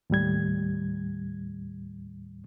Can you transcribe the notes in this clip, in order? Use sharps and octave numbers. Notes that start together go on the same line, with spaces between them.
D#2 A2 G3 G#6